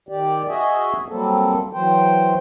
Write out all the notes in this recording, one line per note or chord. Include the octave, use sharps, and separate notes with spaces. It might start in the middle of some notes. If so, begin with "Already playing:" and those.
D#3 G4 D5
F#4 G#4 D#5 E5 G#5
F#3 G3 A#3 C4 A4
E3 F#3 C5 G5